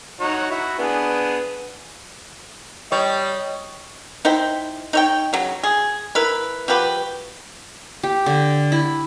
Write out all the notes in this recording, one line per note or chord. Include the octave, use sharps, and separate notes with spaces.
D#4 F#4 C#5
E4 F#4
B3 D4 G#4
G3 C#5 D#5
D#4 E4 C5 G5
D#4 C#5 G5
C#3 F#3
G#4
E4 A#4 B4
F3 F#4 G4 B4
G4
D3
E4